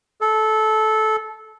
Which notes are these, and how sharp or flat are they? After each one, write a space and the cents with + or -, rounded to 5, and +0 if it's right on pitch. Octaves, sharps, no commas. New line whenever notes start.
A4 -15